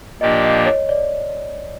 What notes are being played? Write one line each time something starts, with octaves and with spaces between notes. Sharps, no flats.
A#2 F3 A#3 D4 G4 D#5
D#5
C#5
D5